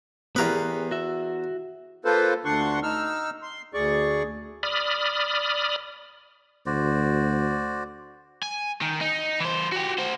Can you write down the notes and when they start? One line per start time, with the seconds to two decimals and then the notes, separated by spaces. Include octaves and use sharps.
0.36 E2 B3 G4 G#4 A#4 B4
0.91 F#4 E5
2.05 A#3 F4 A4 B4 C5
2.45 D2 D3 D4 F#5 C6 C#6
2.83 D#4 E6 F6
3.42 C6
3.74 D2 G#4 D5 C#6
4.63 D5 B5 D#6 F6
6.66 D2 F#4 C5 D5
8.43 G#5
8.82 D#3
9.01 D#4
9.40 E3 C5
9.72 F#4 G4
9.98 F#4 C5